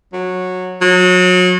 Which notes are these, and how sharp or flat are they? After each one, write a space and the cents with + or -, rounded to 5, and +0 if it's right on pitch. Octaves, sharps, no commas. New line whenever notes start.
F#3 -15
F#3 -30